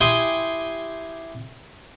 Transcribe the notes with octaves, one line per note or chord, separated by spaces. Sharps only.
E4 G4 G5 G#5 C6 D#6